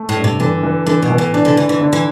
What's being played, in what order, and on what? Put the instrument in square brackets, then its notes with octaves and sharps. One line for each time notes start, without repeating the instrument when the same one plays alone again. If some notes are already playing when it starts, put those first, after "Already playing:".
Already playing: [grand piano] A3
[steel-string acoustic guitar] A2
[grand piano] G2
[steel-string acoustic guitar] C3
[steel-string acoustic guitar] D3 [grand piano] E3
[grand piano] E3
[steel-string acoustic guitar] D3 [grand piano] E3
[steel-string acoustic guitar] B2
[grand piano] E3
[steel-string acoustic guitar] A2
[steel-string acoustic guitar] C3 [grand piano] D4
[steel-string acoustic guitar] D3
[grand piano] D3 [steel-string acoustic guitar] E3
[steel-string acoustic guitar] E3
[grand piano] D3
[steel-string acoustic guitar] E3